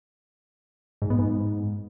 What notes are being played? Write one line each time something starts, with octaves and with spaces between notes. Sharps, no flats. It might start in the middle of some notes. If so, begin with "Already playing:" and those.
G#2
B3
G#2